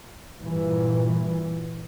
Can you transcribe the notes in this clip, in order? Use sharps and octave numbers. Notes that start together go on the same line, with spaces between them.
G2 A#2 E3